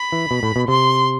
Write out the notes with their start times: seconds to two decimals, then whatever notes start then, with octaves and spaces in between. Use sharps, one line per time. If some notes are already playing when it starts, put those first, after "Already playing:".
Already playing: B5
0.12 E3
0.31 B2
0.43 A2
0.56 B2
0.68 C3 C6